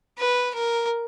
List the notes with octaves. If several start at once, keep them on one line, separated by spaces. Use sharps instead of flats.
B4
A#4